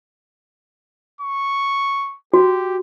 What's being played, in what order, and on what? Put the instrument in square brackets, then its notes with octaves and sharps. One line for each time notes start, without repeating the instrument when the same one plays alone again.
[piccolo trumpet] C#6
[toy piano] F#4 [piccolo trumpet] G4